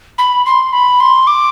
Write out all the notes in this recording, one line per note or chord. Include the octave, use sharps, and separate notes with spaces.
B5
C6
B5
C6
D6